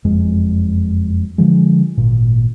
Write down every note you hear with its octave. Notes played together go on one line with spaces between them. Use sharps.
F#1 F2 G#3
D3 F3 G#3
G#1 A#2